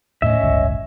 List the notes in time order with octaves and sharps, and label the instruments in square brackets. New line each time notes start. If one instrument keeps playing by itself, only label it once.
[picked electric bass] D#2 A2 A3 [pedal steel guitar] C#4 E5 [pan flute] D#5
[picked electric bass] D1 G1 C#2